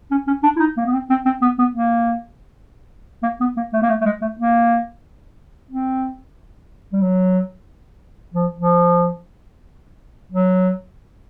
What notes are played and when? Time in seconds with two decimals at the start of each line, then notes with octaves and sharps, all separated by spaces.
0.11 C#4
0.27 C#4
0.43 D4
0.56 E4
0.60 D#4
0.77 A#3
0.86 B3
0.93 C4
1.10 C4
1.26 C4
1.42 B3
1.59 B3
1.75 A#3
3.23 A#3
3.40 B3
3.57 A#3
3.73 A3
3.82 A#3
3.89 A3
4.01 A3
4.05 G#3
4.22 A3
4.39 A#3
5.71 C4
6.93 G3
7.02 F#3
8.34 F3
8.58 F3
10.32 F#3